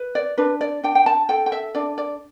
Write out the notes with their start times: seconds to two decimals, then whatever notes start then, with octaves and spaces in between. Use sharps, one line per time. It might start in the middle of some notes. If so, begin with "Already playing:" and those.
Already playing: B4
0.15 D5
0.38 D4 B4
0.61 D5
0.83 D4 G5
0.95 G5
1.06 A5
1.29 A4 G5
1.46 G5
1.52 E5
1.75 D4 D5
1.98 D5